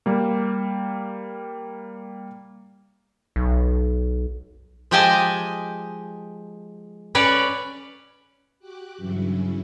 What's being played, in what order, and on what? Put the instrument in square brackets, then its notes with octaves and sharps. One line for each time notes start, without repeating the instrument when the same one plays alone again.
[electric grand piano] G3 A#3
[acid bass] B1
[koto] F3 G#3 G4 D#5 G#5 A5
C#4 B4 C#5 D5
[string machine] F#4 G4 D6 F#6
G2 C#3 E3 F#3 C#4 E4